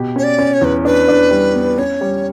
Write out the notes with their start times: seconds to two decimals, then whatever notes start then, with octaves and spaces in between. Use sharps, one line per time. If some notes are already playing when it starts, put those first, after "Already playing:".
Already playing: B2 G4
0.16 C#4 C#5
0.24 D5
0.39 C#4
0.53 C#5
0.61 E2 B4
0.85 D4 B4
1.08 D4
1.31 G3
1.55 B3
1.78 C#4 C#5
2.01 G3